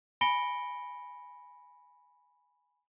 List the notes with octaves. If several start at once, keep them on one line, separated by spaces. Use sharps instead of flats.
G#5 B5 A#6 C#7 D7 G7